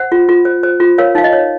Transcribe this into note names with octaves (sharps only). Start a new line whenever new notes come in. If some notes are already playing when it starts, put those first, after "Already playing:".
Already playing: C5 F#5
F4
F4
C5
C5
F4
A#4 C#5 F5
D#4 F5
D#5
C#5